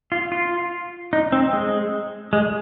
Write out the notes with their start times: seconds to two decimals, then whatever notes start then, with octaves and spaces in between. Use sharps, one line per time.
0.12 F4
0.32 F4
1.13 D#4
1.32 C4
1.53 G#3
2.33 G#3